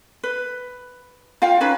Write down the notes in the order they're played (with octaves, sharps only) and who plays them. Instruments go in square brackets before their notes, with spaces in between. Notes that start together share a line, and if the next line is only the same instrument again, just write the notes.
[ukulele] B4
F4 F5 G5
C#4 D#4 B4